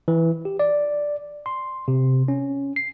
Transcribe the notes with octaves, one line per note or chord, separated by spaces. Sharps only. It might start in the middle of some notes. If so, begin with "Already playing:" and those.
E3
G4
D5
C6
C3
C#4
C7